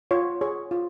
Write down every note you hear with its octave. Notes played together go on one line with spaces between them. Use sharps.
F4 C#5
G#4 C#5
F4